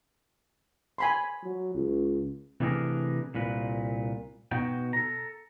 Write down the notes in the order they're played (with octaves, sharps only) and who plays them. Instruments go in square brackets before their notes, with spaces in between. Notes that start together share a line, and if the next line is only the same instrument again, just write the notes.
[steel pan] G#5 B5 C6
[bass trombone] F#3
C#2
[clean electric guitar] C3 E3 A3 D4 G#4 A#4
C2 A#2 B4
B2 D#4 F#4 G5
A4 A#5